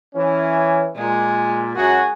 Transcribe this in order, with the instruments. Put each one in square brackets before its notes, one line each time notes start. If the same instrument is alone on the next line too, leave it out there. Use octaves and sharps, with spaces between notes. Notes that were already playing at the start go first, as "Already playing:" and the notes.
[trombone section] E3 C#4
[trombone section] A#2 [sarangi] G#3
[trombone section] F#2 F#4 [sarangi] G#4